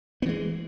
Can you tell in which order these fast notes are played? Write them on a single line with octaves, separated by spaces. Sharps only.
B3 E3 G#3